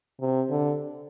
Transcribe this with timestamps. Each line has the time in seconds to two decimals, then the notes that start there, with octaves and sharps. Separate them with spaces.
0.21 C3
0.50 D3